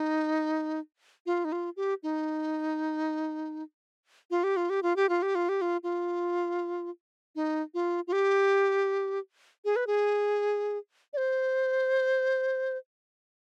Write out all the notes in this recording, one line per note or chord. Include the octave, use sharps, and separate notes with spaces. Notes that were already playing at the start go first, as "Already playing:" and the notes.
Already playing: D#4
F4
D#4
F4
G4
D#4
F4
G4
F4
G4
F4
G4
F4
G4
F4
G4
F4
F4
D#4
F4
F4
G4
G#4
B4
G#4
D5
C5